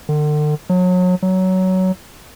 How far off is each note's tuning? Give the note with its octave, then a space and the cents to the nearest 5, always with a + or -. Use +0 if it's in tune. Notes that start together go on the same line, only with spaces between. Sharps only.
D3 +40
F#3 -30
F#3 +15